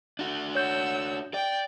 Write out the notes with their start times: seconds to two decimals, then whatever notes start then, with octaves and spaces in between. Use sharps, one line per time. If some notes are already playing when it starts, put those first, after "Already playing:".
0.19 D4 F#4
0.55 C#5 F#5 E6 G6
1.34 D5 G5